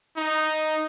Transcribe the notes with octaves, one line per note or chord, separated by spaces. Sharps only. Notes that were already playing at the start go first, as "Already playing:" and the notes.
D#4